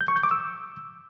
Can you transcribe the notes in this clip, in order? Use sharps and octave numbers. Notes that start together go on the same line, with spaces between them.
G6
C#6
G6
D6
E6